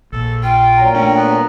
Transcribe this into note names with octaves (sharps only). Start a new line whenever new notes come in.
A#1 A4
F4 G5
A#2 F#3 A#5
A3 C#4 D4
B3